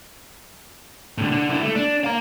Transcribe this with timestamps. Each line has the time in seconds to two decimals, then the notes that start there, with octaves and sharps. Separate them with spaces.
1.18 A2 D3
1.31 D3
1.50 D3 E4
1.63 A3
1.76 D4
2.04 F5 A#5